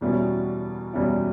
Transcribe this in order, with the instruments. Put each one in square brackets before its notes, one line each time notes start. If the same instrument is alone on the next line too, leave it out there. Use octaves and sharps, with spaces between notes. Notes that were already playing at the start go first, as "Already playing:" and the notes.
[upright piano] E2 B2 G3 C#4 E4
E2 B2 G3 C#4 E4